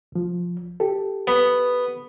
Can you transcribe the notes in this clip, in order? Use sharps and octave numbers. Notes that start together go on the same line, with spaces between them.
C2 F3
G4 A4
B3